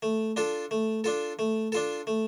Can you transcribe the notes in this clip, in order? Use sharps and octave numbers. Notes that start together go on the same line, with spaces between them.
A3
D4 F4 A4
A3
D4 F4 A4
A3
D4 F4 A4
A3